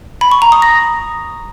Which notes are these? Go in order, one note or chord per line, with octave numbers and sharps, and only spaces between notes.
B5
C#6
A#5
D#6
A#6